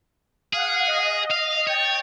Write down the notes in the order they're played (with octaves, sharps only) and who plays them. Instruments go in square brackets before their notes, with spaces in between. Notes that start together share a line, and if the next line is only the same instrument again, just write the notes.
[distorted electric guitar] G#4 [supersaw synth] F5 F#5
[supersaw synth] D#5
[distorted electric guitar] F5
[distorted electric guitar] C#5 [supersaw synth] G5 A6